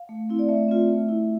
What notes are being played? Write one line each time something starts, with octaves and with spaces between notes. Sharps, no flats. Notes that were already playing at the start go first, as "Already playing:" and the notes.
Already playing: F5
A3
C4 E4
D5
A3 E5
C4 F4
A3
E4